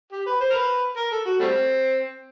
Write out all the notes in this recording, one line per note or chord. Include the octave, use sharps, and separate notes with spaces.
G4
B4
C5
A#4
B4
A#4
A4
F#4
G3 A3 C4